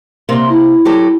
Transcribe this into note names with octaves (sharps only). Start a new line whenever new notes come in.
C3 A#3 C6
E4
F#3 G4 A4